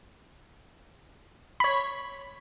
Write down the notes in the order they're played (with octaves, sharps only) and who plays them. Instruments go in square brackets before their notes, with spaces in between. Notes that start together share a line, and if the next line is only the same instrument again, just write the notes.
[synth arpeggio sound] C#5 B5